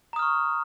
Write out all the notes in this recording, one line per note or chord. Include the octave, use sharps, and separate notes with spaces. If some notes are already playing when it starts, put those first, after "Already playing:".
A#5 C#6 D#6 F6